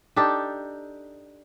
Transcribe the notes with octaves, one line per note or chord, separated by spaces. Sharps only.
D4 D#4 G4 A4